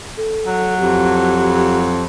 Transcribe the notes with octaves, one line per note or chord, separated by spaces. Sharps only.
A4
F#3
F2 G4